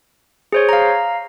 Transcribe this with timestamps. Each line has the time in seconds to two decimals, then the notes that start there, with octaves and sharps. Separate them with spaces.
0.52 G#4 C5 C#5
0.69 F5 A#5